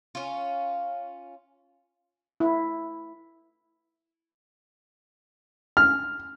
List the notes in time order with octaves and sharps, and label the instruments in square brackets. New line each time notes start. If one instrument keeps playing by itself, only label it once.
[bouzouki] C#4 F4
[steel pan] E4
[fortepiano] F6